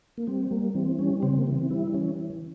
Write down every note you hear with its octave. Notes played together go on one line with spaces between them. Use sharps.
A#3
G3 C4
G3 A#3
E3 C4
G3 C#4
C#3 C4
A#3
E3
C4
G3 E4
E3 C#4